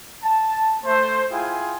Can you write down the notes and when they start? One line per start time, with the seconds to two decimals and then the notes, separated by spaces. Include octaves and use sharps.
0.22 A5
0.84 A3 C5
1.31 E4 F4 G#4 G5 G#5